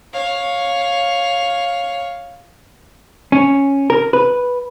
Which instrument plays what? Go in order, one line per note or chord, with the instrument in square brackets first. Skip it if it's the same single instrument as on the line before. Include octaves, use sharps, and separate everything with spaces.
[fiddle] C#5 F5
[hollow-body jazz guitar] C#4
A#4
B4